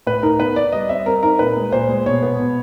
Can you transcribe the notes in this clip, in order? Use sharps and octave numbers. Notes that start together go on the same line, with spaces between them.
A2 B4
D#4 A#4
B3 B4
B3 D5
G3 D#5
C4 E5
C4 A#4
D#4 A#4
A#2 B4
G#3
A#2 C5
G#3
B2 C#5
B3
B2